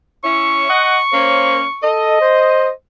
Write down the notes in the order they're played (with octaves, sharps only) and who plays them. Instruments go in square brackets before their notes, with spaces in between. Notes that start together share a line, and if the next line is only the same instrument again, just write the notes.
[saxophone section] C#4 E4 [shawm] C#6
[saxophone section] D#5 F#5
[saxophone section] A#3 C#4 [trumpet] C5
[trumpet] A4 [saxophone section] D#5
[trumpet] C5